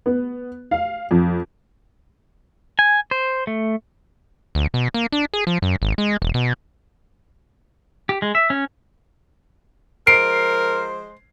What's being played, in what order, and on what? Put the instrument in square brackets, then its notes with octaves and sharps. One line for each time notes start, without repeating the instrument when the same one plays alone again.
[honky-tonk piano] B3
F5
F2
[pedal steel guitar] G#5
C5
A3
[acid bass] D2
B2
A#3
D4
G#4
F3
F#2
G#1
G#3
E1
B2
[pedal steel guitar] G4
G#3
E5
C#4
[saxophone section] F3 G#3 C5 [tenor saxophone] A#4 [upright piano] C7 [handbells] D7